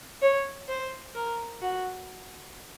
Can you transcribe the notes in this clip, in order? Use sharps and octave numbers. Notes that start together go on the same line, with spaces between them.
C#5
C5
A#4
F#4